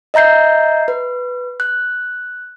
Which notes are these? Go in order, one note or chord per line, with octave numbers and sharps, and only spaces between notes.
D#5 E5 A#5 G6 C7
B4
F#6